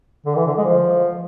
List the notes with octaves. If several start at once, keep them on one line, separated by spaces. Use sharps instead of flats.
D3
E3
D3
G#3
F3